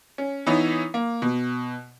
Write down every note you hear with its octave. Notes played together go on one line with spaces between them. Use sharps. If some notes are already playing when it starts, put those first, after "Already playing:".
C#4
E3 B3 D#4 E4 C#5
A#3
B2